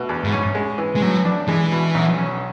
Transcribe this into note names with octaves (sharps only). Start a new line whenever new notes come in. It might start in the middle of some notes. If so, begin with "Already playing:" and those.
Already playing: B2 A3
E2
G#2
C#4
G#3
E3
G#3
A2 F#3
D4
E3 G#3
B2
B1
C#4